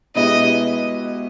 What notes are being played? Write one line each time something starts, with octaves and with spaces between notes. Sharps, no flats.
B2 G#3 B3 E4 G4 D#5